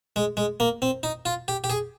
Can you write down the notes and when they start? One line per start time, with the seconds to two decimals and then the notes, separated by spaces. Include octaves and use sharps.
0.16 G#3
0.37 G#3
0.60 A#3
0.82 C4
1.03 D#4
1.25 F4
1.48 G4
1.64 G4
1.70 G#4